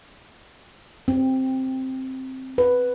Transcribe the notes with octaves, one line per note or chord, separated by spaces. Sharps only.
C4
B4